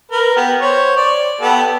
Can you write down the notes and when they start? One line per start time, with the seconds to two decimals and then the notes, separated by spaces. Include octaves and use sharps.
0.11 A#4 B4
0.36 B3 G4
0.61 C5 C#5
0.97 D5
1.41 B3 G4 A4